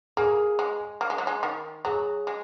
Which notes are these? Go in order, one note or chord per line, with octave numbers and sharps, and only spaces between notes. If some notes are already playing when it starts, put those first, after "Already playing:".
A#3 G#4
G#3
A#3
G#3
F#3
G#3
D#3
F#3 G#4
G#3